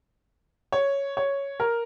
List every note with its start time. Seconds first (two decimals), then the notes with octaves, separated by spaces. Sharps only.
0.72 C#5
1.17 C#5
1.60 A#4